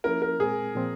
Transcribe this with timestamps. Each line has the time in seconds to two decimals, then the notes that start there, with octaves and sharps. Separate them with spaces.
0.04 F3 A#3 C#4 E4 A#4
0.22 A#4
0.39 A#2 G#3 C4 G#4
0.76 A#2 F3 C4